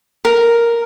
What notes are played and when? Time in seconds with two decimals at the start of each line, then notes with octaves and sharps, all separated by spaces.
0.25 A#4